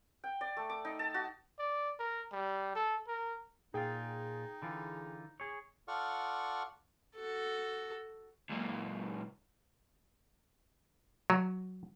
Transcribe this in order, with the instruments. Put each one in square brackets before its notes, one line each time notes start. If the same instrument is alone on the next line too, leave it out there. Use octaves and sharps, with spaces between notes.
[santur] G5
D5
A3
D6
D#4
A5
F#4
[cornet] D5
A#4
G3
A4
A#4
[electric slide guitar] A#2 F4 [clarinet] D#4 [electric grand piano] G#4 G5
[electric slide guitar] D3 E3 F4
G#4 C#5
[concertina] F4 A4 D5 F#5 C#6 F6
[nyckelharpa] F#4 A4
[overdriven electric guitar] C#2 A#2
[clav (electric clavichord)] F#3